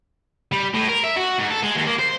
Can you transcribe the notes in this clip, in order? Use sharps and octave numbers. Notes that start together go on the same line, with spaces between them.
G3
A2
A#4
E5
F#4
G#2
A4
G#3
D#2
A#3
C5